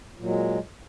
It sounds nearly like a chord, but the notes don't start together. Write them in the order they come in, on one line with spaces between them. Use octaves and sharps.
A#2 F#3 G#3